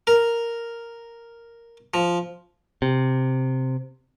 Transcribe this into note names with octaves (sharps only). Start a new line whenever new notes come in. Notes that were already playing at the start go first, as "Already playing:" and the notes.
A#4
F3
C3